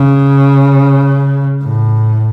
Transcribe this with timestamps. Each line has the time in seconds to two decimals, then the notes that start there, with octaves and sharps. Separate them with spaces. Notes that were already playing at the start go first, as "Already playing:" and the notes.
Already playing: C#3
1.62 A2